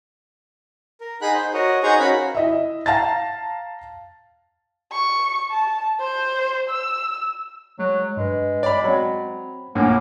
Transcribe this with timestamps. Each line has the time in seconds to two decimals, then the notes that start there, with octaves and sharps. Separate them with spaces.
1.01 A#4
1.22 D#4 G#4 F#5 B5 F#6
1.34 C5
1.54 F#4 A#4 C#5 D#5
1.83 D#4 G#4 C5 F#5 A#5 C#6
2.00 C#4 F#4 A#4 F5 B5
2.35 E4 D#5 E5
2.86 F5 A5 A#5 A6
4.92 C#6
5.51 A5
6.00 C5
6.69 E6
7.79 F#3 G#3
8.17 G2 G#3 B4
8.63 D5 B5
8.84 F#3 C4 B5
9.75 A#1 A2 A#3 F#5 G#5 D6